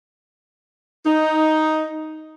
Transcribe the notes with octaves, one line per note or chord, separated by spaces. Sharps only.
D#4